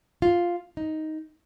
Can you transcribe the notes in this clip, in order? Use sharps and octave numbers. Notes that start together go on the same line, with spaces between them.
F4
D#4